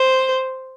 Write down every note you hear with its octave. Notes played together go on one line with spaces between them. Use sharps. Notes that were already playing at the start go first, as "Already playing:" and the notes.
Already playing: C5